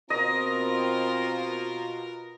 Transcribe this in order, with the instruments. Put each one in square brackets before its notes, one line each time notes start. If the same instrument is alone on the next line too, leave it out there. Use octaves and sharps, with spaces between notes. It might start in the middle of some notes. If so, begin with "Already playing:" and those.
[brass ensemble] B2 F4 [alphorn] C4 [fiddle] A#4 [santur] D#5